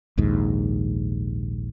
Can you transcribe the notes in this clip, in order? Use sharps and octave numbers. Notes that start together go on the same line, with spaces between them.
A#1 D#2 G#2